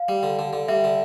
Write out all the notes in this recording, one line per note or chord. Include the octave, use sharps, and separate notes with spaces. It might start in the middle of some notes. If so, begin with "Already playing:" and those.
Already playing: F5
G3
D3
D3
D3
G3 E5
D3